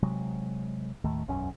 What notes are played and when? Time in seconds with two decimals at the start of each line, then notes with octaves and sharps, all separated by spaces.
0.03 C3 F#3 G#3
1.04 D#2 A2 D#3 A3
1.28 E1 B1 F#2 C#4